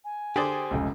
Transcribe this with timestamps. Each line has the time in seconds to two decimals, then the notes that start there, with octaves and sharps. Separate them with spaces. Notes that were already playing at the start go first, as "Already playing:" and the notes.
0.04 G#5
0.36 D3 G4 G#4 C5 D5
0.71 F1 C#2